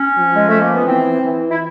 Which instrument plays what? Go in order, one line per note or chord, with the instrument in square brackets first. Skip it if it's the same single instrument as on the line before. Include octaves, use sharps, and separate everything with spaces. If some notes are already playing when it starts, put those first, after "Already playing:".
Already playing: [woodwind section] C#4
[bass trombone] F3
[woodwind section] G#3
A3
A#3
B3
[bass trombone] E3 [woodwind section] C4
[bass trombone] E3
[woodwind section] E4